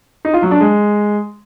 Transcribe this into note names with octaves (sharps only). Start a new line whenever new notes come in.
D#4
F4
F#3
D4
G#3